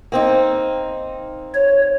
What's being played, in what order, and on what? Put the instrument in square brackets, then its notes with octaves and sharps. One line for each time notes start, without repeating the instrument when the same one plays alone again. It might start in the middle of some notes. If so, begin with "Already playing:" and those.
[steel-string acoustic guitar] A#3 C4 D#4
[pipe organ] C#5